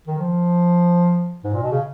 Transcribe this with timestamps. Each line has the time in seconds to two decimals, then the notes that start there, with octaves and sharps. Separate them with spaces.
0.07 D#3
0.19 F3
1.44 G#2
1.53 A#2
1.63 B2
1.72 C#3